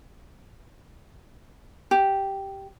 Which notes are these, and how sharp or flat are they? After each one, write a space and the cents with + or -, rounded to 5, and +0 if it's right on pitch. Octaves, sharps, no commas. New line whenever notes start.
G4 -5